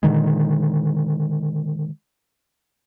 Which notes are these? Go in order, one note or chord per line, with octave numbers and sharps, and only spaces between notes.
A#2 D3 D#3 G#3